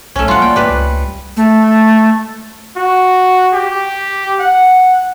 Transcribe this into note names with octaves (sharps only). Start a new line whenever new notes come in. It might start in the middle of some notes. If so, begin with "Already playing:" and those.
B1 A3 C#4
G3 F4 F#5
A#3 D5 G5
G3 B4
C#2
A3
F#4
G4
F#5